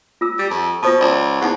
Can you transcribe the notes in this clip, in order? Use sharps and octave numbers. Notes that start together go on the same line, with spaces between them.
F4 E6
G3
F2
B2 F4 C5 A5
C#2 D5 A#5 C#6
E2 D#4 F#5